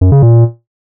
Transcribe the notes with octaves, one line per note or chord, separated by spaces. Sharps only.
F#2
C#3
A#2